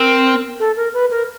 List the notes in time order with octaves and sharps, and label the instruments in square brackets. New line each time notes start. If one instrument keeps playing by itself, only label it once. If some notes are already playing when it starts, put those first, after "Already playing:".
Already playing: [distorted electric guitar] C4 [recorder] A#4
[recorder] A4
A#4
B4
A#4